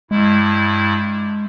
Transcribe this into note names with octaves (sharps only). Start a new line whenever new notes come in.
G2 G#3 E4